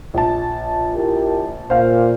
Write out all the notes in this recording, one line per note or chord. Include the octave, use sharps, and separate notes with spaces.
A#1 A5
E4 G4 A#4
A#2 C5 F5